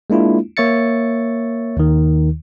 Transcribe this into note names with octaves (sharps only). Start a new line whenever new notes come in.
G#3 A#3 D4 E4 F4
A#3 C#5 E5 A6 C#7
D#2 D#3